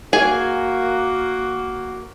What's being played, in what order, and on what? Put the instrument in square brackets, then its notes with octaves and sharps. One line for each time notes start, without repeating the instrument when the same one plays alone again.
[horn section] A#3 F#4 [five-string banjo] G#4 G#5